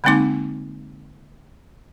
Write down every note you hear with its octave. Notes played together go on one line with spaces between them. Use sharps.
D3 G#3 A#3 C4 D#4 D6